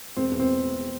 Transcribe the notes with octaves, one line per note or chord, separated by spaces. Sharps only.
E1 C4
E2
C4